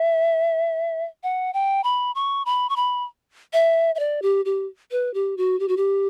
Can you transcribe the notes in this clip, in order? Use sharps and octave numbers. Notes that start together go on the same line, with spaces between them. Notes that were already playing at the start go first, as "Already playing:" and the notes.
Already playing: E5
F#5
G5
B5
C#6
B5
C#6
B5
E5
E5
D5
G4
G4
B4
G4
F#4
G4
F#4
G4